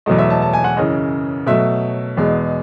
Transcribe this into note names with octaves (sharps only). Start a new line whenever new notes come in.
E2 B2 F#3 A3 D#5
E5
A5
A5
G#5
F#5
F#2 C#3 E3 D#5
B2 F#3 A3 E5
E2 B2 G#3